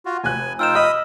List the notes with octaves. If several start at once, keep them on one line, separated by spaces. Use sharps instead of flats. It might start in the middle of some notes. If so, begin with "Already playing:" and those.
F4 F#4
F1 G#5 F#6
D#4 F4 G5 E6 F6 E7
D#5 B5 D#6 F6